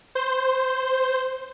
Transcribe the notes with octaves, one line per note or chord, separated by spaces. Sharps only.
C5 G6